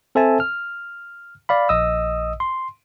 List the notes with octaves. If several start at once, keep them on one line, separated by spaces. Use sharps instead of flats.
C4 A4 C5 E5 G#5 A5
F6
D5 F5 B5
A#1 D#5 D#6 E6
C6